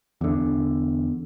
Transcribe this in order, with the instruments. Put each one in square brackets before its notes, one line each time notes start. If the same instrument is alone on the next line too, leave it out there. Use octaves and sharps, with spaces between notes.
[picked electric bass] E2 D3